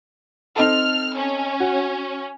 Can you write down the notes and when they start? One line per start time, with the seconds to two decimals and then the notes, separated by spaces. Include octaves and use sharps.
0.56 C4 D#4 A4 F6
1.17 C#4
1.60 F#4